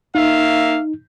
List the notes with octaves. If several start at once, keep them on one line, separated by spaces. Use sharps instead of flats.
A#3 D#4 E5 F5